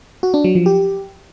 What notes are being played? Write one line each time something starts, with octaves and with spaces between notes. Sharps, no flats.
F#4
D4
F#3
F3
G4